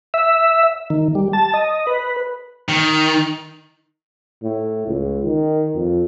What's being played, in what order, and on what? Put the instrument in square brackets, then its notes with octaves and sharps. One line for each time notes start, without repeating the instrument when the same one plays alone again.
[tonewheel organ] E5
D#3
G3
A5
D#5
B4
[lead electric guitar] D#3
[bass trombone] A2
C#2
D#3
F2